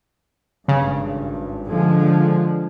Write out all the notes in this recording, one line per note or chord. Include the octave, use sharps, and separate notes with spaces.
G#1 G2 C#3
D3 F3 G#3